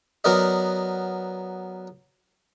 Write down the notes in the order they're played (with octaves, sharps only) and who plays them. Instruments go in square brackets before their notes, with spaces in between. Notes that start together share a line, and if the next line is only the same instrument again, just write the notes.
[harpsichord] F#3 B3 A#4 D5 D#5